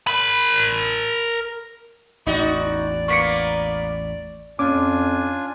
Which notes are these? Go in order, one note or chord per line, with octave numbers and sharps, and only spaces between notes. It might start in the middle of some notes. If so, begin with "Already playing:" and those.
A#4 B5
A1 E2 D#4 F#4 D5
A#3 B3 C#6 B6 C#7
F2 C#4 D4 F4 G#5 D6